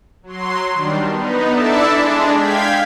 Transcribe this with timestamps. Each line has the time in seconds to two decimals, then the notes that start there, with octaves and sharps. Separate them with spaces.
0.23 F#3 C6
0.73 D#3 G3 D4
1.07 B3 D#4
1.50 D4 E4 A4 D5 E5 A5
1.91 G#3 D4
2.32 F5 G5 G#6 B6